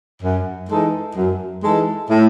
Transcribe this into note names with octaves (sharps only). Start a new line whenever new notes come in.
F#2
E3 G#3 D#4 A4
F#2
E3 G#3 D#4 A4
A2